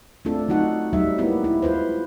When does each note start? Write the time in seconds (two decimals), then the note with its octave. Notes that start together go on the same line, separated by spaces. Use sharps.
0.25 A3 C4 D4 F4 A4
0.48 F#3 A3 D#4 F#4 F#5
0.93 F#3 G3 D#4 E5
1.18 G#3 A#3 B3 E4 G4
1.44 E4
1.63 F4 B4 C5